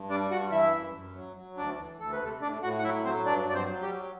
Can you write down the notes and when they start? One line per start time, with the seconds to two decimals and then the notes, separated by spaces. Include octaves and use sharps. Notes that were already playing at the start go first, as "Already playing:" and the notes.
Already playing: G2
0.09 G3 D4 D5
0.31 G2 F#4 F#5
0.52 E3 E4 E5
0.73 F#2
0.94 F#2
1.15 F#3
1.36 F#3
1.57 D2 D4 D5
1.78 E3
1.99 D2 A4
2.12 B4
2.20 C3 A3 A4
2.41 A2 D4 D5
2.62 A2 F#4 F#5
2.79 F#5
2.84 F#3 E4 E5
3.04 F#3 C4 C5
3.26 G2 D4 D5
3.47 G2 D5
3.55 C4 C5
3.68 F#3
3.82 G3 G4
3.89 F#3